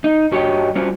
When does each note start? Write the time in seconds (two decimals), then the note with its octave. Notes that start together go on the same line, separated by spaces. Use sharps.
0.04 D#4
0.32 G2 F#4 G4 C#5 D#5 G5
0.75 G3 C#4 F4 F#4 C5